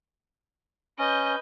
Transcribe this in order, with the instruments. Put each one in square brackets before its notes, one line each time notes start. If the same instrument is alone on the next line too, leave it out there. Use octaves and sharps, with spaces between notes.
[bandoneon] C#4 [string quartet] B4 G6 [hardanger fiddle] D#5